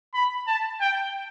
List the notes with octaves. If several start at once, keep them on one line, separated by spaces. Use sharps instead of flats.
B5
A5
G5